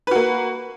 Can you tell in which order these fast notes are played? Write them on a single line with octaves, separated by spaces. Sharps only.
B4 F#4 A#3